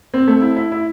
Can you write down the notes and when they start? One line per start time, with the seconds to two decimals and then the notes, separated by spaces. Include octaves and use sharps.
0.14 C4
0.27 A3
0.41 E4
0.56 E4
0.72 E4